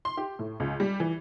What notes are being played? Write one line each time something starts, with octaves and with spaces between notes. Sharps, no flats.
C6
G4
A2
C#2
G3
E3